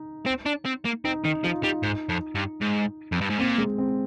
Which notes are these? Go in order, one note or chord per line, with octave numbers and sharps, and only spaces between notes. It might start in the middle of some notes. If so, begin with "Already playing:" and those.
Already playing: D#4
C4
D4
C4
A#3
C4 D#4
D#3 D#4
F3 F4
G3 D#4
G#2
F2
G2
G#2
F2
G2
G#2
A#2 C4
G#3
C4